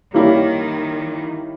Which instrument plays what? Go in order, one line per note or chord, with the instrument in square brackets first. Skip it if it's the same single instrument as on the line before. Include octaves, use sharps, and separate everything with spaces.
[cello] D#3 [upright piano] G3 A#3 C#4 E4 G4